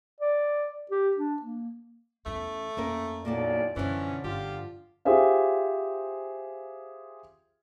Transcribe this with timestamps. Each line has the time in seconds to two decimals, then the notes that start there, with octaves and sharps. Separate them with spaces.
0.20 D5
0.91 G4
1.17 D4
1.42 A#3
2.26 E2 A3 C#4
2.77 F2 A#3 C#4 A#4
3.25 B1 A#2 A#3 E4 A4 D5
3.76 F#2 B2 D3 E3 F3 C#4
4.24 G1 F4 G4
5.05 F4 G4 G#4 C5 E5 F5